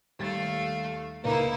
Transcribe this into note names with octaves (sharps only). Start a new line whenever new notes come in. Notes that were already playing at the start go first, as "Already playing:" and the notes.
D#2 G3 A3 F5 A6
C#2 A#3 D#4 E4 B4